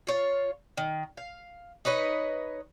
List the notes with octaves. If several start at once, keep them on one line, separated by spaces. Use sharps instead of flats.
F4 C#5
D#3
F5
D#4 B4 C#5 D#5